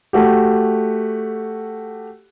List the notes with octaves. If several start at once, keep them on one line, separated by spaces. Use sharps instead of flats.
A3 F#4 G4